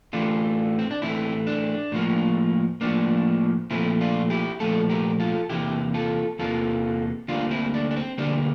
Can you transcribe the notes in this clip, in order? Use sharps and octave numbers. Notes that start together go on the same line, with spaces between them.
A2 E3 A3 D4 F4
C4
D4
A2 E3 A3 C4 E4
D4
A2 F3 A#3
A2 F3 A#3 D4
A#2 F3 A3 C4 E4
D4 F4
E4 G4
A#2 F3 A3 F4 A4
G4 A#4
F4 A4
E2 C3 E3 A#3 E4 G4
F4 A4
E2 C3 E3 A#3 F4 A4
D2 D3 G3 A#3 D4 F4
C4 E4
D4
D4
C4
D2 D3 G3 A#3 D4